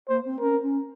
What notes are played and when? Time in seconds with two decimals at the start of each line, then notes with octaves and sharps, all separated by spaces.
0.09 A#3 C5
0.25 C4
0.41 C#4 A#4
0.62 C#4